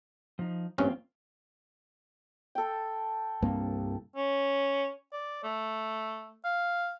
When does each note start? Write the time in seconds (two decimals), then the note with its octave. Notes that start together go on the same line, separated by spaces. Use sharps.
0.39 F3 D#4
0.78 A1 G2 A#3 C4 C#4 F4
2.55 A4 G5
3.42 C2 G2 A#3
4.16 C#4
5.12 D5
5.44 A3
6.45 F5